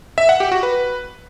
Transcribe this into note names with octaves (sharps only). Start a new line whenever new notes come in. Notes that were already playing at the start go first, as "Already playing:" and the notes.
E5
F#5
G4
F#4
B4